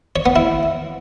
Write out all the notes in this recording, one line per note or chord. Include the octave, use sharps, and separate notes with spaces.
C#5
B3
E4